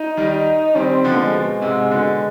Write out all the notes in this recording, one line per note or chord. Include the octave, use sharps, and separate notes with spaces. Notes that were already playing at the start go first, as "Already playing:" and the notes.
Already playing: D#4
D#3 G3
D#4
D#3 G3 C4
D3 F3
G#3
B2
G#2 C3
B2 D3